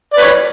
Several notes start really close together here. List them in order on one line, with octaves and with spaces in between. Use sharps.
D5 B4 C#5